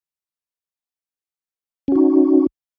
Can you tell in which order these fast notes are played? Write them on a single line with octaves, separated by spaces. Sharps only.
C#4 F#4 D#4